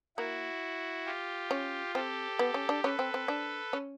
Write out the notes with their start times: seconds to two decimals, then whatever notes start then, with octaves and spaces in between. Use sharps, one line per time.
0.17 A#3 E4 F#4
1.06 F4 G4
1.51 C#4
1.95 C4 G4 A4
2.39 B3
2.54 C#4
2.69 D4
2.84 C#4 A4 B4
2.99 C4
3.14 C4
3.28 D4
3.73 C#4